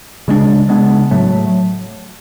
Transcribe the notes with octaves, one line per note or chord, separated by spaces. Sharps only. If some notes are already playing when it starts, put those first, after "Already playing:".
C#3 G#3 B3 D4
C#3 G#3 B3 D4
A2 F#3 A3